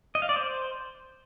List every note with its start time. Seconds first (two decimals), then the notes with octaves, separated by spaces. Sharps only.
0.15 D#5
0.22 F5
0.29 D5
0.36 C5